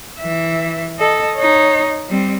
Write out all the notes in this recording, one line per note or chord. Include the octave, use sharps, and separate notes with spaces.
E3 E5
A4 D#5
D#4 C#5
G3 C4